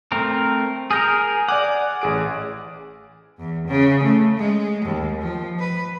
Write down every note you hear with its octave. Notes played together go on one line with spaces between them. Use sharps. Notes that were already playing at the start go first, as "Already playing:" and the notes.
A3 C4 A#4
G#4 A#4 F6 G6 A#6
D5 F#5 G#5 D6
A1 G#4 D7
E2
C#3
A3
G#3
D#2
F3
B4